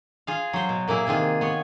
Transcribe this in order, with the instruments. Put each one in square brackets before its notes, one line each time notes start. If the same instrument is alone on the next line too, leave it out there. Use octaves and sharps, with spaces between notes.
[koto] F4 G#4 F5
F#3 C5
B2
A#2 A#3 E4 G#4
C3 D#3 F4 G#4
B3 C#5